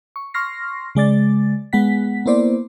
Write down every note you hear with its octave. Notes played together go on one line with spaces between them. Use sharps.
C#6
C6 C#6 F6 A#6 C7
C#3 G#3 D5 A6
G#3 B3 F#5 B6
A#3 B3 E4 C5 D5